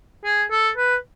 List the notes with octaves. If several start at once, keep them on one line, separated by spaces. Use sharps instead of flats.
G#4
A4
B4